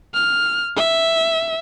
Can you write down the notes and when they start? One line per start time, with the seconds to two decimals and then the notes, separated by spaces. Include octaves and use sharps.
0.13 F6
0.76 E5